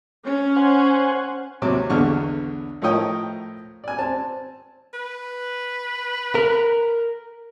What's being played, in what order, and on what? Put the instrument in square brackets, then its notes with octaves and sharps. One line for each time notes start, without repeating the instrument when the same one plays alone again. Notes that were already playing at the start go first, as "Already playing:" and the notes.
[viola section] C#4
[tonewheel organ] C5 F#5 G#5
[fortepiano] D#2 C3 F#3 D6
B1 E2 D3 B3 C#6 F6
A2 F3 A#4 C#5 D#5 G5
D5 G#5
C4 A5
[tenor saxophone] B4
[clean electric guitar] A#4